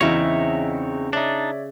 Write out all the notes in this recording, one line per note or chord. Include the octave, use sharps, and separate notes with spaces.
E2 C#3 C4 D#4 E4 C#5 D#5 E5
D4 D#4 C#5 D5 E5